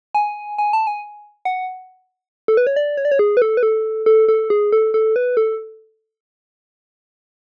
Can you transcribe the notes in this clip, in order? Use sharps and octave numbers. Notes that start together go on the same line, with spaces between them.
G#5
G#5
A5
G#5
F#5
A4
B4
C#5
D5
C#5
D5
C#5
G#4
B4
A4
B4
A4
A4
A4
G#4
A4
A4
B4
A4